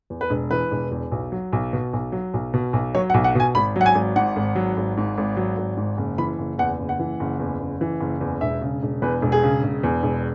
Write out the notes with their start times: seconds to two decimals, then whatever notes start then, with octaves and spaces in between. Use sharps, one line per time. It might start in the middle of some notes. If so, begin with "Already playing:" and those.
0.10 E2
0.21 B4
0.30 E1
0.51 E3 B4
0.71 E1
0.91 E2
1.12 B1
1.32 F#3
1.53 B1
1.73 B2
1.93 B1
2.12 F#3
2.34 B1
2.54 B2
2.73 B1
2.95 F#3 C#5
3.10 F#5
3.14 B1
3.24 F#5
3.35 B2 G#5
3.55 G#1 B5
3.76 F#3
3.81 F#5
3.86 G#5
3.95 G#1
4.16 G#2 F#5
4.36 G#1
4.56 F#3
4.77 G#1
4.97 G#2
5.18 G#1
5.37 F#3
5.57 G#1
5.77 G#2
5.98 F#1
6.18 E3 B5
6.39 F#1
6.59 E2 F#5
6.79 F#1
6.89 F#5
6.99 E3
7.20 F#1
7.39 E2
7.60 F#1
7.81 E3
8.01 F#1
8.21 E2
8.41 E1 E5
8.61 C#3
8.83 E1
9.02 E2 B4
9.22 E1
9.32 G#4
9.43 C#3
9.63 E1
9.83 E2
10.03 E1